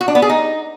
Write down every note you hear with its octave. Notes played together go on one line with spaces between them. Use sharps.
F#4
D4
B3
G#4
D#4